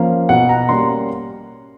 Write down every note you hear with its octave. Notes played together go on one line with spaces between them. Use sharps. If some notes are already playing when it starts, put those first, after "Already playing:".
Already playing: F3 A#3 C#4 F5
B2 F#5
A#5
G3 A#3 C#4 C6